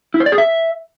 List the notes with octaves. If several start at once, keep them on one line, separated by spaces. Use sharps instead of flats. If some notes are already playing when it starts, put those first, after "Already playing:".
E4
C5
D5
G#4
E5